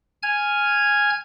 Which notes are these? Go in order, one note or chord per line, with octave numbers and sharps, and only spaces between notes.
G#5 F6 G#6